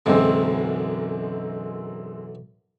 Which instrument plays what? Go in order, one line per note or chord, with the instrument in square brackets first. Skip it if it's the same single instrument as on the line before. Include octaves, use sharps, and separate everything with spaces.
[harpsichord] B1 D3 E3 [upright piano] F#2 G#3 C4